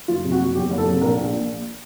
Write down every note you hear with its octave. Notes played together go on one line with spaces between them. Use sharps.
F#1 F4
C3
F#4
F#1
E2 G4
F#1
A4
C3
A#1 A#4
A#1
A#2